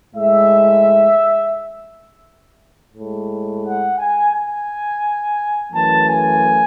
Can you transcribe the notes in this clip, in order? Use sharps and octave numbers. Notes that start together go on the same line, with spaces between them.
A2 G#3 E5
A2 G#3
F#5
G#5
G#5
F#2 E3 A3 A5
G#5